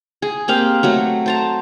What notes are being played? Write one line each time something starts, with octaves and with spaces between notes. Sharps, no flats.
G#4
A#3 C4 G4 F5
F#3 A3 F#4
C5 A5 A#5